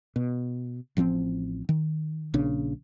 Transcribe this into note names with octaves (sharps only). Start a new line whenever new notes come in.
B2
A1 F3 B3 C4
D#3
A#1 C#3 D4